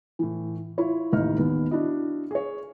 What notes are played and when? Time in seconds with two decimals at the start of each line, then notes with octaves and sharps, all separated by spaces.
0.19 A2 E3
0.78 E4 F4 C#5
1.13 A1 D#2 A2 D#4 F6
1.38 D#2 B3
1.71 D4 E4 F#4 D#5
2.31 G#4 C#5